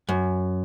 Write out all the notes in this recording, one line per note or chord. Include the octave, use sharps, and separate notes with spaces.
F#2